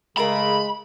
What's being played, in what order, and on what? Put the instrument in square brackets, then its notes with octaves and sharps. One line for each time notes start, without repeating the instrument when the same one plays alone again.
[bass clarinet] C#3 [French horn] G#3 [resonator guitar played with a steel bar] A3 G#4 A#4 [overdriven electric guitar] B5